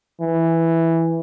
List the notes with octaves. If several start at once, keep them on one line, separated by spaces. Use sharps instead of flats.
E3